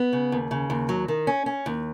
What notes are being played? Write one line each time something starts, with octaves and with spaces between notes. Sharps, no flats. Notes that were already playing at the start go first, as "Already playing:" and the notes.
Already playing: B3
C#3
D#2
C#3
D#2
F#3
D#3
C#4
C#4
D#2